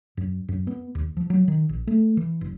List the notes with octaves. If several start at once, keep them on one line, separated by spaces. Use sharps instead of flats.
F#2
F#2
B3
D#2
F3
F#3
D#3
A#1
A3
E3
F#1